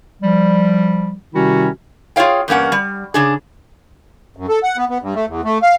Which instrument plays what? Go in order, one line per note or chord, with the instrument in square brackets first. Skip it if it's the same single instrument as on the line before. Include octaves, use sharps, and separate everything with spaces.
[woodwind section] F3 G3
C3 D#3 G3 C#4 E4 F#4
[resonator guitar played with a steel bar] F4 G#4 C#5 F5 G5
E2 G2 A#3 C#4 F#5
G3
C#3 D4 G#4
[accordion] F#2
A4
F#5
B3
B3
G2
A3
E2
A3
F5